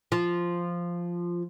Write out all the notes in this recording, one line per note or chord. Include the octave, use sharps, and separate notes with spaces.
F3